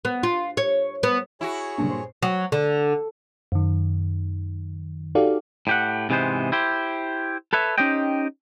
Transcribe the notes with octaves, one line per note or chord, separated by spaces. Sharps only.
B3
F4
C#5
B3
E4 F#4 G#4 C#5
G2 A#2 C#3 F#3 D4
C5 C6
F#3
D3
F#2 D#3
D#4 F#4 G4 A4 D5 F5
A2 G4 F#5
G#2 C3 E3 G#3 B3 C5
E4 G4 C5
A4 B4 C#5 E5
C#4 D#4 G4 C5 D#5 G5